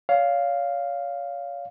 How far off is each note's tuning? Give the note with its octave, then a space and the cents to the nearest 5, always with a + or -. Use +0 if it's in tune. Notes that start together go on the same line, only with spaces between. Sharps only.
C#5 +35 F5 +0